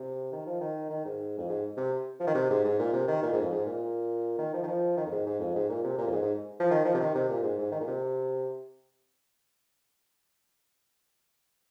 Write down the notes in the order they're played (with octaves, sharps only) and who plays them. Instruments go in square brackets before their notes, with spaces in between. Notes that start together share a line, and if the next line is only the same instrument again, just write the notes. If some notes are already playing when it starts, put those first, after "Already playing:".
Already playing: [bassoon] C3
D#3
F3
D#3
D#3
G#2
F2
G#2
C3
F3
D#3
C3
G#2
G#2
A#2
C3
D#3
A#2
G#2
F2
G#2
A#2
D#3
F3
D#3
F3
D#3
F2
G#2
G#2
F2
G#2
A#2
C3
A#2
F2
G#2
G#2
F3
D#3
F3
C3
D#3
C3
A#2
G#2
G#2
D#3
A#2
C3